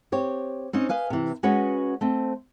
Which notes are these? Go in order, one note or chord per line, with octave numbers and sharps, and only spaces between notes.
C4 G4 C#5
C4 C#4 D#4
B4 D#5 F5 G#5
C3 E3
G#3 C#4 F#4 B4 C#5 D#5
A3 C4